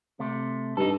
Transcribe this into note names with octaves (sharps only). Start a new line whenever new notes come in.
C3 A3
G2 D#4 A4